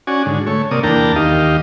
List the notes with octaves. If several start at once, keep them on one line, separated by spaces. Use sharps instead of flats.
C#4 F#4 D5 G#5
G#2 D3
A3 C#5
C3 A#3 D5 D#6
E2 A#3 D4 G5 A5 A#5
D#2 G4 D#5 F5